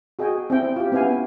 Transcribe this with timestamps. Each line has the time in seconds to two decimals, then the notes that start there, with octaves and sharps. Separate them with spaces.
0.19 F#4 G#4 D#5 G5 G#5
0.50 C4 E4 G5
0.76 F4 G4
0.92 B3 C#4 E4 F5 G#5